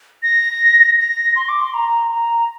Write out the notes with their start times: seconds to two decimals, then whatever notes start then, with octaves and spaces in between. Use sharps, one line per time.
0.23 A#6
0.99 A#6
1.36 C6
1.49 D6
1.61 C6
1.74 A#5
2.11 A#5